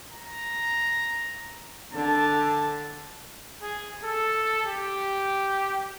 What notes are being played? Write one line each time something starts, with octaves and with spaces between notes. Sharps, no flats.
A#5
D3 A5
G#4
A4
G4